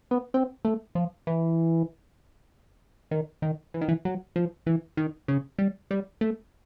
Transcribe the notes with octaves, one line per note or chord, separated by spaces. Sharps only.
B3
C4
A3
F3
E3
D#3
D#3
E3
D#3
E3
F#3
F3
E3
D#3
C#3
G3
G3
A3